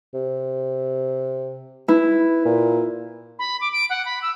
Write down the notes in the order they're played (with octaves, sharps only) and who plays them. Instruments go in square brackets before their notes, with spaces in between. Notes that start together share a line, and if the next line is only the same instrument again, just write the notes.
[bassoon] C3
[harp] E4 [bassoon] B4
[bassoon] A#2
[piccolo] B5
D6
D7
F#5
B5
E6